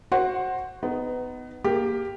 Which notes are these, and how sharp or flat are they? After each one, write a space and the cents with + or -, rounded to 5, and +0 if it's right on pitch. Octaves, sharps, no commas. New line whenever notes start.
F#4 +0 C5 +20 F#5 +0
B3 +25 D#4 +0
A#3 +0 G4 +5